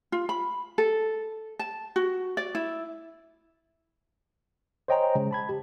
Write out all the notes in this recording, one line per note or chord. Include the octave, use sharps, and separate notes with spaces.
F4
B5
A4
A5
F#4
D5
E4
C5 C#5 D#5 G5 G#5 A#5
C#3 G#3
A5 B5 G#6
G4